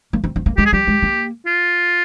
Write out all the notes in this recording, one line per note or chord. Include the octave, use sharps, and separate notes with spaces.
A#3
C4
C4
A#3
G#3 G4
G#4
G3 G4
G#3
A#3
F4